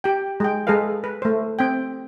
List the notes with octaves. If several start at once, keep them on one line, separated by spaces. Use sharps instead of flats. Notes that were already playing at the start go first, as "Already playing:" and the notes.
G4 G5
G#3 G5
G#3 G#4 A4 B4 F5
B4
A3 C5
C4 G5